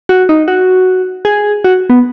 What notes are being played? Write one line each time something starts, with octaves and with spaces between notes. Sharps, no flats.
F#4
D#4
F#4
G#4
F#4
B3